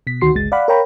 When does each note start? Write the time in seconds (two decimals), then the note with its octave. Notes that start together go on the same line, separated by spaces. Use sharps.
0.07 B2 B6
0.21 D2 D#3 F#4 C6 C7
0.34 G1 C#2 G#3 A6
0.52 D5 F5 F#5 B5
0.68 A#4 C#5 F5 G5 A#5 B5